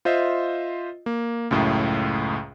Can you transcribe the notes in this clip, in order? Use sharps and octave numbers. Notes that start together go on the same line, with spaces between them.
F4 C5 D#5 E5
A#3
C#2 F#2 A2